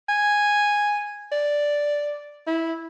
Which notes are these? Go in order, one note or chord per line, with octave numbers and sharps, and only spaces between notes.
G#5
D5
E4